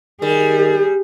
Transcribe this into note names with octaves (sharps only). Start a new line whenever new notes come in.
D#3 G3 G#4